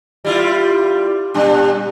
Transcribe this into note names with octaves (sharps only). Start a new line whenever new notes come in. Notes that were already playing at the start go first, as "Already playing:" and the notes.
G3 E4 F4
A#2 G3 D4